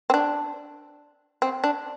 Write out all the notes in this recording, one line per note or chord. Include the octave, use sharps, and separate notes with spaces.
C4
D4
C4
D4